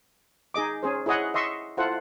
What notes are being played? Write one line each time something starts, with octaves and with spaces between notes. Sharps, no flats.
D#4 G#4 D#5 D6
C#4 G#4 C5
E4 G#4 C#5 D#5 F#5
D#5 E5 C6 C#6
E4 F4 A4 C5 F#5